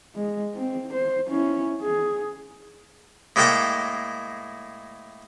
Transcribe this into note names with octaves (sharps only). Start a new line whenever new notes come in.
G#3
C4
C5
C#4 E4
G#4
A2 G#3 A#3 A4 G5 D6